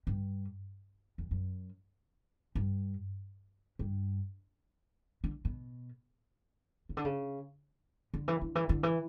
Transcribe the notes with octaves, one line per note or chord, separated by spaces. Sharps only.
G2
E2
F#2
G2
G2
D3
B2
C#3
D3
C#3
D3
E3
D3
E3
D3
E3